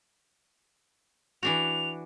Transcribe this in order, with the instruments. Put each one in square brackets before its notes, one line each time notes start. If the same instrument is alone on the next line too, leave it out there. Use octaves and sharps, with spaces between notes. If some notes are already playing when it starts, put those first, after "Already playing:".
[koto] E3 D4 F#4 [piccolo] F7